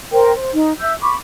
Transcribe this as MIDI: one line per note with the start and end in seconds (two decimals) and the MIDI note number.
0.11 0.31 70
0.11 0.31 72
0.11 0.31 79
0.36 0.50 72
0.53 0.73 63
0.80 0.93 76
0.80 0.93 88
0.80 0.93 91
1.01 1.15 83
1.01 1.15 85
1.01 1.15 86